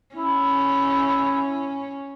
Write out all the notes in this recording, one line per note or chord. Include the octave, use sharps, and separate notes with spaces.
C#4 E4